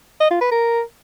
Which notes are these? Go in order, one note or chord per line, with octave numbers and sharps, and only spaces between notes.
D#5
F4
B4
A#4